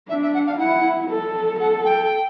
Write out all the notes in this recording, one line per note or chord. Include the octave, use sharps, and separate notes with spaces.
D4 E5
E5
F#5
F5
E4 F#5
A4
A4 F#5
G5